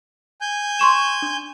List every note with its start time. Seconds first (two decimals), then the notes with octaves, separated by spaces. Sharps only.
0.41 G#5 G6
0.79 C6 C#6 E7
1.22 D4